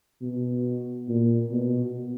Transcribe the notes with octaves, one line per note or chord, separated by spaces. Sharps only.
B2
A#2
B2